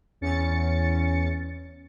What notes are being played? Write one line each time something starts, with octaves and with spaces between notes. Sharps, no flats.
E2 C#4 A6 C#7